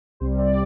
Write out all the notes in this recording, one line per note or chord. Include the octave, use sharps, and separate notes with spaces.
C2 C3 G3 C4 C5
D5